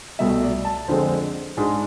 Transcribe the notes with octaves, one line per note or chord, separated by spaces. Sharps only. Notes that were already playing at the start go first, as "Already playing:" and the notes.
C2 B2 A3 E5
D5
A5
F2 D3 G#3 C4 C5
G#2 G#3 D4